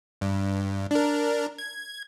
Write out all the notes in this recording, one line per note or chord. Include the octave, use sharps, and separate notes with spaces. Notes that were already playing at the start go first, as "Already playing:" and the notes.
G2
D4 A#4
G#6